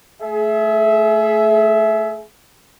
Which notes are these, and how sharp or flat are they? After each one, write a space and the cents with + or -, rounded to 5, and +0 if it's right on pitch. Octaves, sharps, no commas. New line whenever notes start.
A3 +0 G#4 +35 E5 +0